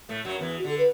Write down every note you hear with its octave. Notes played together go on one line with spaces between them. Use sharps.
A2 A3
F#2 F#3
E2 E3
F#4
D3 A4
B4